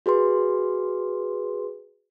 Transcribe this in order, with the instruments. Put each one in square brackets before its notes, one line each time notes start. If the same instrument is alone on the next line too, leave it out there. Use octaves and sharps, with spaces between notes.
[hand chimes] F#4 G#4 B4 C6